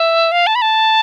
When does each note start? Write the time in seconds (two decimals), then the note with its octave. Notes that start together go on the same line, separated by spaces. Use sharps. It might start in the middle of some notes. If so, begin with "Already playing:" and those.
Already playing: E5
0.32 F5
0.47 A5
0.55 B5
0.62 A5